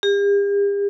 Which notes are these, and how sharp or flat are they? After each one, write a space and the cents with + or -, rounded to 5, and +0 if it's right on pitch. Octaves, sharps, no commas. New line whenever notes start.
G4 +45